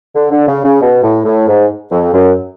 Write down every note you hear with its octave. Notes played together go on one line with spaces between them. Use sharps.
D3
D3
C#3
C#3
B2
A2
A2
G#2
F2
F#2